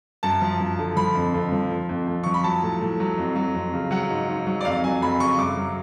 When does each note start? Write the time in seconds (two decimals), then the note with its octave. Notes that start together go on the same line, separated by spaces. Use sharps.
0.23 F#2 A5
0.41 F3
0.60 F#2
0.78 D3
0.96 F3 B5
1.15 F2
1.34 F2
1.52 F3
1.71 F3
1.89 F2
2.08 F2
2.23 F3 C#6
2.34 B5
2.44 F#3 A5
2.63 A2
2.81 A2
3.00 F#3
3.18 F2
3.36 F#3
3.55 F2
3.73 C#3
3.91 F#3 F#5
4.09 G#2
4.28 G#2
4.47 F#3
4.61 D5
4.65 F2 F5
4.84 F#3 G#5
5.02 F2 B5
5.20 C#3 C#6
5.39 F#2 D6
5.57 F#3